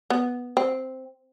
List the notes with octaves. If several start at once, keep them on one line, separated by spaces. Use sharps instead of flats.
B3
C4